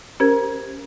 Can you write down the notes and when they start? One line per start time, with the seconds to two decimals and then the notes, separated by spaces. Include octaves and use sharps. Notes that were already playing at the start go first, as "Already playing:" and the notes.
0.20 C#4 G4 A#4 C5 G#6